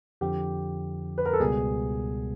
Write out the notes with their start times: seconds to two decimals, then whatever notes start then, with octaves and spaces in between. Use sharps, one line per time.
0.21 F2 D3 F3 G4
1.18 B4
1.25 A#4
1.33 A4
1.40 C#2 B2 G3 B3 G#4